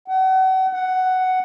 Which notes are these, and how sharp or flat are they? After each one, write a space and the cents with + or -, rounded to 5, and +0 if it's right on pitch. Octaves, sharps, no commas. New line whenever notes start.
F#5 +35
F#5 +5